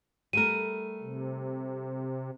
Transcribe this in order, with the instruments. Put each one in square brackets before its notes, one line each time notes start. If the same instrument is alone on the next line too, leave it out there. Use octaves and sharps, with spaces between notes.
[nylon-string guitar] G3 A3 A#4 [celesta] D#7
[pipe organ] C3